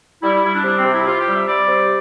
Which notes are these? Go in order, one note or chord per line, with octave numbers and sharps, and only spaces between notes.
G3 E4
E4
G3 E4
D4
C3 D4
C4
C3
E4
C3 F4
G4
G3
E5
G3 D5
C3